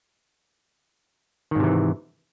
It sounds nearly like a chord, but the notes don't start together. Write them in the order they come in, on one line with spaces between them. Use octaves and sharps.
D#3 G#2 C3 E3